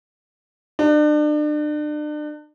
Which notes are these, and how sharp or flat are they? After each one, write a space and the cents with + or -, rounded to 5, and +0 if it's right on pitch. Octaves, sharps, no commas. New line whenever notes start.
D4 +35